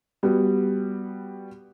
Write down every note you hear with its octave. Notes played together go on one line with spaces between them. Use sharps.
G3 B3 F#4